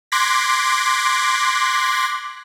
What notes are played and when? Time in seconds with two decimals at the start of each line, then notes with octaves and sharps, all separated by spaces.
0.12 C6 D6 F#6 G#6 A#6 B6